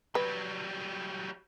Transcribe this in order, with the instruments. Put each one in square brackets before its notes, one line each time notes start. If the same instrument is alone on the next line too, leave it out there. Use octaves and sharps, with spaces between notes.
[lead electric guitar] F#3 G3 [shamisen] B4